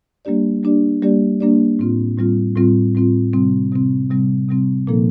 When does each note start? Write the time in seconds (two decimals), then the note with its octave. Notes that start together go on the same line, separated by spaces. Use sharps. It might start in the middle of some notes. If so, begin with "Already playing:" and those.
0.25 G3 A#3 D4 G4 D5
0.63 G3 A#3 D4 G4 D5
1.02 G3 A#3 D4 G4 D5
1.40 G3 A#3 D4 G4 D5
1.79 A2 G3 C4 F4
2.17 A2 G3 C4 F4
2.56 A2 G3 C4 F4
2.95 A2 G3 C4 F4
3.33 C3 G3 C4
3.72 C3 G3 C4
4.10 C3 G3 C4
4.49 C3 G3 C4
4.87 A#2 F3 A#3 D#4 A4